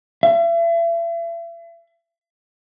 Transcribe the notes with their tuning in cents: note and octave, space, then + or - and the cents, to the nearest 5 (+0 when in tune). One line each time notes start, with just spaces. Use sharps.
E5 +40